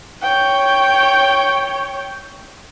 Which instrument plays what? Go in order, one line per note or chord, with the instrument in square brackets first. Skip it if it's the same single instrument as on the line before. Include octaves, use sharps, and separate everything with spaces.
[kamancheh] C#5 G5